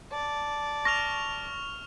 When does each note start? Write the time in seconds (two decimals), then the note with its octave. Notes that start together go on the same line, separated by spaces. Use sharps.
0.13 D5 A5
0.85 C#6 F6 A#6 F7